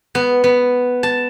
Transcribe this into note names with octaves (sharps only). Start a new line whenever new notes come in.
B3
B3
A5